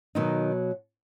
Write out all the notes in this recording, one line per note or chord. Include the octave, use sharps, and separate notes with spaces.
B2 D#3 F#3 D#4